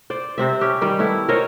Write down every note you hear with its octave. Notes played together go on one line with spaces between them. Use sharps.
C5 D5
C3 C4 E5
C#4 G4
D#3 G3
A3 B3 E4
A#4 C5 C#5 D#5